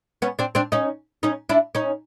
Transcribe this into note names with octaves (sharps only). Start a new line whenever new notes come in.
B3 C#4
C4 D4
C4 D4
C#4 D#4
C#4 D#4
D4 E4
C#4 D#4